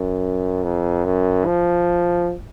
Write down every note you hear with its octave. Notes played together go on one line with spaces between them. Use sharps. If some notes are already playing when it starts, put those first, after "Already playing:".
Already playing: F#2
F2
F#2
F3